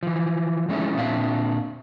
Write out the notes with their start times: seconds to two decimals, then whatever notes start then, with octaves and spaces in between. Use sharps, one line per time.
0.03 E3 F3
0.69 F3 G#3 A3 C#4 D#4 E4
0.97 A#2 C4 D4 E5 F5